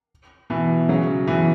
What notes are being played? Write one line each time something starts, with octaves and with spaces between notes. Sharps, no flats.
B2 E3
C#3 F#3
B2 E3